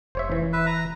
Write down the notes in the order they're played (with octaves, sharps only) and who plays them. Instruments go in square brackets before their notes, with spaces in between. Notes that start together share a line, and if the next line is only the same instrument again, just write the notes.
[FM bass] F1 [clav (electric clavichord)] C5 C#5 E5
[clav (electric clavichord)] E3
[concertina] B4 E5
A#5